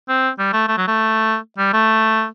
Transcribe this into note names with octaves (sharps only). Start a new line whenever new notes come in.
C4
G3
A3
A3
F#3
A3
G3
A3